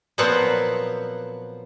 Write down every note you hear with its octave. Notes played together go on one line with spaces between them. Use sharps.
A#2 F3 F#3 B3 C4 F#5